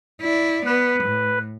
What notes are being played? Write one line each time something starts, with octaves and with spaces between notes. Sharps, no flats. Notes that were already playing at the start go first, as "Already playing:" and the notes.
E4 D5
B3 B4
A2